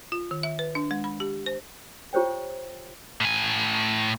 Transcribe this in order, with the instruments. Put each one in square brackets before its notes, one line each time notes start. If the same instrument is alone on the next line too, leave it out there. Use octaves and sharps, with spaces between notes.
[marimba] F4
D#3
E5
B4
D4
G#3
B5
G4
C5
[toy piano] F4 G4 C5 C#5 G5
[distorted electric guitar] A2 G#5